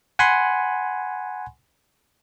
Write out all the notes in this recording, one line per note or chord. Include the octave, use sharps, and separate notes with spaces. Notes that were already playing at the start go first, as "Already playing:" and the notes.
F#5 G#5 B5 C6